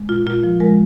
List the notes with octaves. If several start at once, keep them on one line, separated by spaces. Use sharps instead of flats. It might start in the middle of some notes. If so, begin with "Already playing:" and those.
Already playing: G#3
A#2 F4
A#2 F4
F3
G#3 A#4